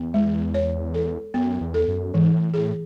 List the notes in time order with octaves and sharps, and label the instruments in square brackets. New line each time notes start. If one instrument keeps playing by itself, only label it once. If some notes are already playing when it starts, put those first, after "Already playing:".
Already playing: [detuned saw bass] E2 [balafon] B3
[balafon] G#3
C#5
A4
[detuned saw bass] F#2 [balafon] B3
[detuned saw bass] E2
[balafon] A4
[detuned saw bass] F#2
[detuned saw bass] G#2 [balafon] E3
[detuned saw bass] A2
[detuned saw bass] A2 [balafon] G#4